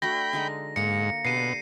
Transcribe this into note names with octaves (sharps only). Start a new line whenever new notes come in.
A3 D4 F#4 G5 B5 A#6
D3 G#3 D#4
G#2 A#3 A#5 C#7
B2 D4 G4 C7 D#7